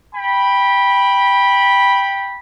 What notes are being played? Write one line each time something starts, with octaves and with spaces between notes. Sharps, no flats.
G5 B5